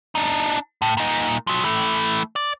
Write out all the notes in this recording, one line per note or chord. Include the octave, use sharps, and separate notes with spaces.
D4 D#4
A2
A#2 D#4
F3 F#3
E3 A3
D5